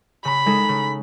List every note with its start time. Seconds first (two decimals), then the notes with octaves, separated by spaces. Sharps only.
0.25 C#3 B5
0.46 G#3 D#4 A4
0.69 C#3